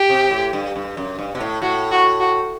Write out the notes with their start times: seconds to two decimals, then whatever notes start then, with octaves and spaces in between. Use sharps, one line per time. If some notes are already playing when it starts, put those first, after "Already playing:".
Already playing: G4
0.10 C3
0.31 A2
0.53 G2
0.76 G2
0.97 F#2
1.19 G2
1.35 B2
1.40 A2
1.62 A2 F#4
1.91 F#4
2.20 F#4